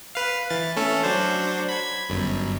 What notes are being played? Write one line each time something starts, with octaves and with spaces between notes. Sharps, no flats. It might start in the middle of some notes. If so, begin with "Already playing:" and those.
B4 F5
E3 A6
A3 C#4 A4
F#3 D4 C5
B5 G#6
G1 F#2